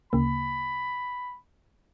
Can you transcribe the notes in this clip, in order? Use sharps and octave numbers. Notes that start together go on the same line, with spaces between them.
D2 C#3 A#3 B5